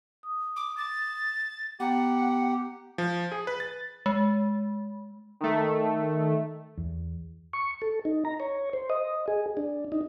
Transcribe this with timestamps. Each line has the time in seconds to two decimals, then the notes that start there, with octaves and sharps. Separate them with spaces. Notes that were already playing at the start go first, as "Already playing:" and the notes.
0.23 D#6
0.56 D6
0.77 A6
1.80 B3 G4 F#5 A#5
2.98 F3
3.32 G#4
3.47 B4
3.60 A6
4.06 G#3
5.41 D#3 A3
6.77 E2
7.53 C#6
7.82 A4
8.05 D#4
8.25 A#5
8.40 C#5
8.73 C5
8.90 D#5
9.28 G#4
9.57 D4
9.92 D#4